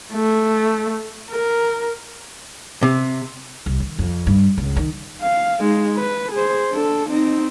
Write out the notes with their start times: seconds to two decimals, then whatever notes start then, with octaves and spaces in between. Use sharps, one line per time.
0.13 A3
1.30 A#4
2.83 C3
3.66 C2
3.80 D#3
3.99 F2
4.27 G2
4.58 C#2
4.76 D#3
5.21 F5
5.60 G#3 D#4
5.97 B4
6.32 G#4 C5
6.71 D4 A4
7.10 C4 D#4